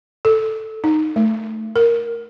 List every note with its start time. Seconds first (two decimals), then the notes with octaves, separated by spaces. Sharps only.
0.25 A4
0.84 D#4
1.16 A3
1.76 A#4